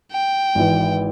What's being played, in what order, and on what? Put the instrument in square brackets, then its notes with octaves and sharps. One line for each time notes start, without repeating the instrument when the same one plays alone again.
[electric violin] G5
[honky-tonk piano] G#1 E3